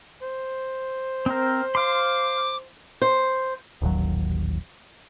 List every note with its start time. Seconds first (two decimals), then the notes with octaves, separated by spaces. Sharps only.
0.22 C5
1.26 C4 A#4
1.75 F5 C6 D6
3.02 C5
3.82 D#1 A1 D#2 F#3